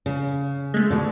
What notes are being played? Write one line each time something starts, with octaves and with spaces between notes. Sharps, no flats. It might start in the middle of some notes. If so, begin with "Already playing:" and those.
C#3
G#3 A3
D2 B2 D3